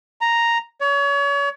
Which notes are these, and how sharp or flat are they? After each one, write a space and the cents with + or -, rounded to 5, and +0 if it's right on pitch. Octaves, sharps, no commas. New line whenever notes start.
A#5 +0
C#5 +35